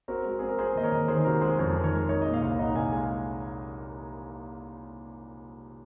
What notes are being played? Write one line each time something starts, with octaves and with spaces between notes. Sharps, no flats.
C4 F#4 A#4
G#3 F#4
C4 G#4
A#4
C4 G#4 C5
D#2 D#5
A#4 C#5
D#2
D#3 G#4 C5
C3 F#4 A#4
G#3 G#4 C5
F2 A#4 C#5
D#3
A#4 C#5
G#3
D#4 A#4 C#5
A#2 D#5
C#5 F5
C2
D#4 D#5 F#5
C2 F5 G#5
G#3 F5 G#5